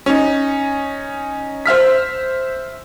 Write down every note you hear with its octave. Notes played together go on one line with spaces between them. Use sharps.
C#4 D#4
C5 E5 F6 B6